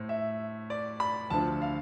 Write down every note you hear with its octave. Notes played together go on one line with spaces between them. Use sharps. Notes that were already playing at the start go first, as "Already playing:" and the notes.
Already playing: A2 C5
E5
D5
B5
D2 D3 F3 A5
F5